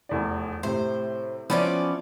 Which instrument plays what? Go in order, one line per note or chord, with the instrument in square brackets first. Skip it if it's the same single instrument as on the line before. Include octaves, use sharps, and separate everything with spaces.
[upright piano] F1 E2 D5
[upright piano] A2 C3 [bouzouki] C5
[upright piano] E3 F3 [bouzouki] B3 C#4 D5